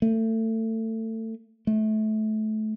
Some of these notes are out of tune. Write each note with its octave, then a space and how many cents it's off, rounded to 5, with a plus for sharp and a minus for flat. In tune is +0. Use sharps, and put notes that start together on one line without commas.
A3 +25
A3 -25